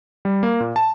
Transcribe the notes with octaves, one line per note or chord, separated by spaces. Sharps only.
G3
A#3
A#2
A5